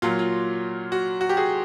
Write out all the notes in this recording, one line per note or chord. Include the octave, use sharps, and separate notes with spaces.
A#2 F#3 F4
F4
F#4
F#4
G4
F#4 G#4